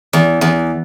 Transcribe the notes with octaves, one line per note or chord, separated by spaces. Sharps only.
E2
E2